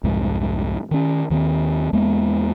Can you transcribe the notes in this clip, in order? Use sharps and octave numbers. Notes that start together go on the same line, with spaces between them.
C2 F2 G#2
D#3 C#4
D#2 D#3 A3 C4
E2 G#3 A#3 B3